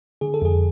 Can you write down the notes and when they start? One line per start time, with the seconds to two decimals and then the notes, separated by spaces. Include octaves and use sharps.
0.21 D3 G#4
0.34 A4
0.42 F2 G#4